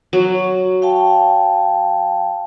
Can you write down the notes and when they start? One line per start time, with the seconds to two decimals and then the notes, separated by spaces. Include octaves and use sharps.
0.13 F#3
0.82 F5 G5 A5